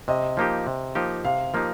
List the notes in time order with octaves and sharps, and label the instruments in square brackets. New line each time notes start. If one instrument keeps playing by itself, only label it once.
[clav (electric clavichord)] C3 [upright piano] D#5
[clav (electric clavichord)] F3 A#3 D#4 G4
C3
F3 A#3 D#4 G4
[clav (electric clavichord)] C3 [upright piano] F5
[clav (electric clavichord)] F3 A#3 D#4 G4